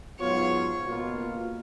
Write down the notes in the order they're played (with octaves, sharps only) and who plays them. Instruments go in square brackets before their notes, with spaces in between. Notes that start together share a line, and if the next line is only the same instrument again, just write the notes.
[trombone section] G#2 F#3 B3 F4 [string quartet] C#5
[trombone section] C#2 B2 A#3 F4